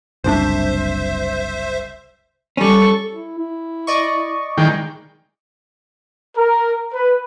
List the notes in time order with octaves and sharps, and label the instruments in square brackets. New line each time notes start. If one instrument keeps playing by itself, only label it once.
[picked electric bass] F#1 C2 D4 [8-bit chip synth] C5 E5
[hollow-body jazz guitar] G3 C#4 [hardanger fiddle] A4 C#6
[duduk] E4
E4
[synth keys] D5 D#5 C#6
[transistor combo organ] D#3 G#3 G5 [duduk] E4
[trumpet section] A#4
B4